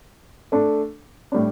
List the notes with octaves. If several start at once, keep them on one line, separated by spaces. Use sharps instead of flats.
A3 D4 A4
A2 G3 D4